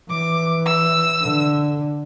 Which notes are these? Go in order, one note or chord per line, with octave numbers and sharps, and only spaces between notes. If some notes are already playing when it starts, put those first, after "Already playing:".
E3 D6
E6
D3